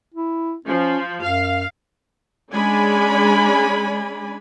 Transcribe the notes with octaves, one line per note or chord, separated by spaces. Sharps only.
E4
F3 C#4
F#2 F5
G#3 C#4 D4 D5 G#5 B5